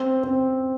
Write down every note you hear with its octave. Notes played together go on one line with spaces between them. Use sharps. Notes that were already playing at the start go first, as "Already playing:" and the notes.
Already playing: C4
C4